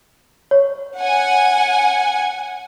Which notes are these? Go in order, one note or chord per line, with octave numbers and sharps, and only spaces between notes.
C#5
F#5 G#5